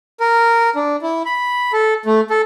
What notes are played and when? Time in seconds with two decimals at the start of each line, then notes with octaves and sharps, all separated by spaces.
0.20 A#4
0.76 D4
1.02 E4
1.25 B5
1.73 A4
2.06 A3
2.30 A4